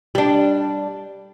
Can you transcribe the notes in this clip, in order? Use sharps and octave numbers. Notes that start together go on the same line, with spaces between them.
G3 D4